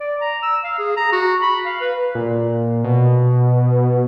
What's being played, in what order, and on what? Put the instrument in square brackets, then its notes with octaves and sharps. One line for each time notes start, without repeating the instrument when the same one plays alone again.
[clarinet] D5
A#5
E6
F5
G#4
A#5
F#4
B5
F5
B4
[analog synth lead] A#2
B2